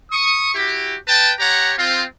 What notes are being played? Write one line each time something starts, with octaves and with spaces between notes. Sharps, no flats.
C#6 D#6
E4 F#4 G4
B4 G5 A5
G4 C#5 F#5 A#5
C4 F4